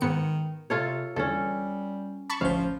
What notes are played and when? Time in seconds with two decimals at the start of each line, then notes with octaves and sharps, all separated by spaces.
0.01 G#2 D#3 B3 C#7
0.70 C3 F4 A4 C#5
1.16 E2 D3 G3 C#4 A4
2.30 A5 B5 C#6
2.41 A1 D2 F3 C#4 C5 F5